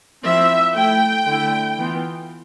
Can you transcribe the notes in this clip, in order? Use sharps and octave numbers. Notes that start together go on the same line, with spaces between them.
F3 C4 E4 E5
A3 E4 G5
D3 A3 E4
E3 B3 F4